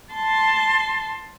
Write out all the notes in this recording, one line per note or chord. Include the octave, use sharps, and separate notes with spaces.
A5 C6